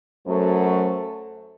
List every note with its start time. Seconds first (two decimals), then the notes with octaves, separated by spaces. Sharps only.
0.25 F#2 F#3 A3 C5